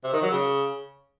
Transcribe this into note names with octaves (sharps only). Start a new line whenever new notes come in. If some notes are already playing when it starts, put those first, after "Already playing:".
C3
D#3
F#3
C#3